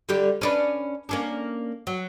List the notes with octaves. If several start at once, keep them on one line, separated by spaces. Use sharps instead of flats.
D3 G3 G4
C#4 D4 B4
A#3 C#4 D4
F#3